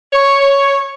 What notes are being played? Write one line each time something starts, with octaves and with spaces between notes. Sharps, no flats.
C#5